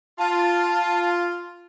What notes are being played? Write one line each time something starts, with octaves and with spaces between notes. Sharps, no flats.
F4 A5